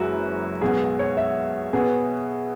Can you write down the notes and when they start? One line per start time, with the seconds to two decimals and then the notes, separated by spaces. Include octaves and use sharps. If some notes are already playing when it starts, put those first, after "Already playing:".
Already playing: F#1 F#2 E3 G#3 E4 F#4
0.61 B1 B2 G#3 G#4
0.99 C#5
1.17 E5
1.73 B2 B3 G#4